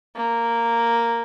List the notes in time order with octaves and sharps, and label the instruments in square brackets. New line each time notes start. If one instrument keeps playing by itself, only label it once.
[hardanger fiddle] A#3